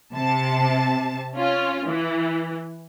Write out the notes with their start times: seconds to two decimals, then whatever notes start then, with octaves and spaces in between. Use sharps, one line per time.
0.13 C3 A5
1.35 C#4 F4
1.87 E3